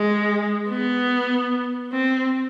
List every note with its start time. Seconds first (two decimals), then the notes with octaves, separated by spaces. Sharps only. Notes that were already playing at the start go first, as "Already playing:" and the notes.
Already playing: G#3
0.70 B3
1.93 C4